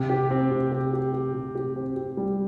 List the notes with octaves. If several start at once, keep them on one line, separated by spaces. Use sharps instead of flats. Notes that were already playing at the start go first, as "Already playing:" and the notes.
Already playing: C3
G4
C4
C3
G4
G4
G4
C3
G4
C4
G4
G3